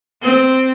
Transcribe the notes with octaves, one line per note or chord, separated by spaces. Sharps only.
C4